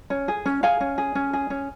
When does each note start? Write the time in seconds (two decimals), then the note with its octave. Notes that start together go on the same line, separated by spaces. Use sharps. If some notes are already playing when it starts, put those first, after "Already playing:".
0.10 C#4
0.28 G#4
0.46 C#4
0.63 G#4 F5 G#5
0.80 C#4
0.98 G#4
1.15 C#4
1.33 G#4
1.50 C#4